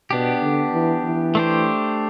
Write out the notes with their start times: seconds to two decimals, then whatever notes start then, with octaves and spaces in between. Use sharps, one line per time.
0.10 B2 B3 D4 G4
0.42 D3
0.73 E3
1.04 E3
1.35 A3 D4 G4 C5